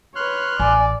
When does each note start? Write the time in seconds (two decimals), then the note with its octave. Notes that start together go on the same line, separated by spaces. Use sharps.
0.16 B4 C#5 C6 F6 F#6
0.60 A1 D5 G#5